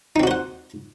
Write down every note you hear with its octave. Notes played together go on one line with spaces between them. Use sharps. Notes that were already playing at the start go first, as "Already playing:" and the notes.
C4 D#4 F#4 C5 F#5